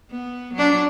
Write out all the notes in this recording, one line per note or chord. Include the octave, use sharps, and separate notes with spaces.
B3
F#3 D4